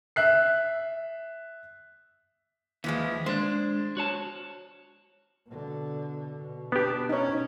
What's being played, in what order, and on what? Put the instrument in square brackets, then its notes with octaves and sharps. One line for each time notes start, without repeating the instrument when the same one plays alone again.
[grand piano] E5 F#6 C7
[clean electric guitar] D#2 [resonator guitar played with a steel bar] E3 F3 G#3
[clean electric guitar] G#3 D4 [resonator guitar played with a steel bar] C5
[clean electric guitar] F#4 C#5 A5
[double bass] B2 D3
B2
[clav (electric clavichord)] B3 G4 [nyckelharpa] D4
[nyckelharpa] C#4 [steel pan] D#4 C#5